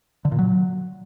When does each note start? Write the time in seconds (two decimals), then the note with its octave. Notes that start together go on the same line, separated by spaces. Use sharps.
0.25 D3
0.32 A#2
0.39 F#3